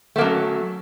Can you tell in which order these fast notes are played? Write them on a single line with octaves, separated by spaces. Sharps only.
A3 A#3 F#3 C#4